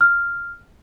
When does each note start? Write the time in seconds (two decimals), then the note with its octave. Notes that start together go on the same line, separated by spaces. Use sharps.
0.01 F6